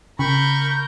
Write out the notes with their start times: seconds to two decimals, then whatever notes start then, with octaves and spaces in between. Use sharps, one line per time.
0.19 C#3 A#4 B5 C#6 G6